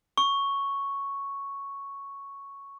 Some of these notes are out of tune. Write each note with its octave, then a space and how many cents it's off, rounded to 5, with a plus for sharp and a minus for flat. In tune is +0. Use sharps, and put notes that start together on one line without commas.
C#6 +0